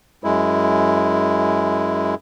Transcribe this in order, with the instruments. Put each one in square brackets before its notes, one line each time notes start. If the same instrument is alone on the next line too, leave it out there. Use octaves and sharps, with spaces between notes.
[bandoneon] F#2 G#3 E4